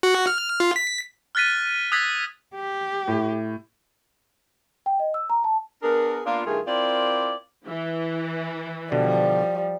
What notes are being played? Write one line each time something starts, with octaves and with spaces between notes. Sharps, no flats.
F#4
F6
F4
B6
F6 F#6 A6 B6 D#7
D#6 E6 F#6 G#6 A6 B6
G4
A2
G5
D#5
E6
A#5
A5
B3 D4 G#4 A#4
A#3 B3 D4 F4
G2 D#3 A3 F4 G#4 A#4
C4 E4 F4 A#4 D5
E3
B2 D3 F3 G3